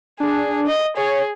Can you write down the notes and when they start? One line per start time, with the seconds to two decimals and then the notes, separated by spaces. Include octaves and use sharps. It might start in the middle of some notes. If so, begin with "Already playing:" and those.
0.20 D4 G#4
0.67 D#5
0.97 G#4 C#5